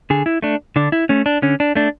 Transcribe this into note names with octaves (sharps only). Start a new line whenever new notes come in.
D3 G#4
E4
A3 D4
D3 D4
E4
A3 C#4
D4
D3 C#4
D4
A3 D4